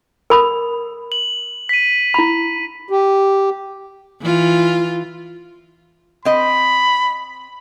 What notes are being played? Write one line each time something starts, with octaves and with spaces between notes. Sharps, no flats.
A#4 B5 D#6
F#7
B6 D#7
E4 B5
G4
E3 F4
C4 D#5 B5